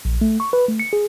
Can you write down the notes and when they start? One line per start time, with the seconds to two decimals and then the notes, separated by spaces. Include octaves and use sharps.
0.05 A#1
0.21 A3
0.40 C#6
0.53 B4
0.68 A3
0.80 C#7
0.93 G#4